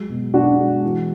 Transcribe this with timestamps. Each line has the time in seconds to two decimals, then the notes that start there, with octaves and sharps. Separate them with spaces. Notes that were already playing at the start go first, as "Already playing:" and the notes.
Already playing: F#3 G#3
0.09 B2
0.33 B2 D4 F#4
0.59 G#3
0.84 E3